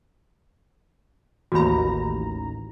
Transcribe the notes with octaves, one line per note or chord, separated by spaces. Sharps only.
A1 D#2 F#4 A#5 B5